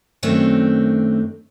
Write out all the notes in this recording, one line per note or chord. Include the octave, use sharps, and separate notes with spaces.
F#2 D#3 A3 C4 D4 F#4